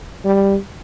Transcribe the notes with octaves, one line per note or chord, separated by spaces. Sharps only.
G3